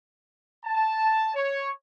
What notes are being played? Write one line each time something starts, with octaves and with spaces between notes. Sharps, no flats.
A5
C#5